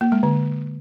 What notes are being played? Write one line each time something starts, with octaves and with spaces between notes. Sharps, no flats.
A#3
G#3
D3